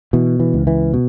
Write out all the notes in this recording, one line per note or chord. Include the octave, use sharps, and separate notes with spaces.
B2 E3
E3
C#2
E3
B2